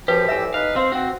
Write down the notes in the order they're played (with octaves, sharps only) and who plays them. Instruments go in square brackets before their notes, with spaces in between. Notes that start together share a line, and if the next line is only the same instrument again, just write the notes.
[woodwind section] F#2 F3 [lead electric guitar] G4 [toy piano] B4
[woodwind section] A2 G3 E6 [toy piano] E5 G#5
[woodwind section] D#4 B4 [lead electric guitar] F5
[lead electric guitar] C4 [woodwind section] C5 F5
[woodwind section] C4 [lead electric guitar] F#4